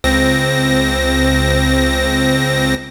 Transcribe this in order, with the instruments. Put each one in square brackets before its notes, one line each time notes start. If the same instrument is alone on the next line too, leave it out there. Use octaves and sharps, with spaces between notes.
[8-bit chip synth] C#2 C4 A#6